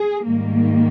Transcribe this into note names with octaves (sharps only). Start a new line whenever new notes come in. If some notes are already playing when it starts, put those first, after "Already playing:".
Already playing: G#4
G#2 D#3 G3 A#3